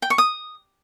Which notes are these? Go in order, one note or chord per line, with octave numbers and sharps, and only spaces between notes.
G5
C#6
D#6